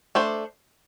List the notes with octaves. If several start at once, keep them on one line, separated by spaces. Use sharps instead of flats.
A3 D4 C5